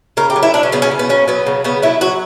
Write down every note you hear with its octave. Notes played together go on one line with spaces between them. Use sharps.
C#3 A#4
G4
F#3
E4
F#3 D4
C#4
C#3 B3
C#4
C#3
B3
F#3 C#4
F#3 B3
C#3
C#3 B3
F#3 E4
F#3 F#4